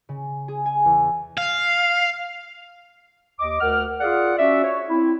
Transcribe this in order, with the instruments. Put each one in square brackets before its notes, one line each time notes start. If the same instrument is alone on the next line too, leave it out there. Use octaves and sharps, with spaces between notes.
[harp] C#3
G#4
G#5
E2
[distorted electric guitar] F5
[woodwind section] D#2 D#5 D6
D2 A#4 F#5 F6
F4 G#4 D5 F5 F#5
C#4 F#4 D5 E5
C#5
C4 E4